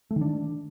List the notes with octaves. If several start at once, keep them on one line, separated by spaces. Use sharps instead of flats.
A3
D#3
D4